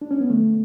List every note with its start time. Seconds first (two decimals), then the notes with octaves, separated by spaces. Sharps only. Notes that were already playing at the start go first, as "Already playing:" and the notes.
0.01 D4
0.11 C#4
0.20 B3
0.30 D3 A3